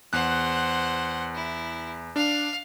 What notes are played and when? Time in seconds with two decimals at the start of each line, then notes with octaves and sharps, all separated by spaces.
0.13 E2 C5 F#5 F#6
1.34 E4
2.16 D4 F5